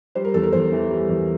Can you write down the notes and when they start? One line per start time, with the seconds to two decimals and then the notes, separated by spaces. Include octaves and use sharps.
0.15 G3 C5
0.25 A#4
0.34 E2 A4
0.43 A#4
0.53 E2 C5
0.72 E3
0.90 G3
1.09 E2